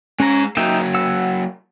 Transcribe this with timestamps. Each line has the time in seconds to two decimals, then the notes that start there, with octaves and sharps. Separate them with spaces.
0.20 G#3 C#4 A#5
0.57 F#3 A#3 D#4 E5 G5
0.94 F#5 E6